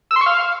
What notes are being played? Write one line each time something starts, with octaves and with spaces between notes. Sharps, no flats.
E6
C6
C#6
F5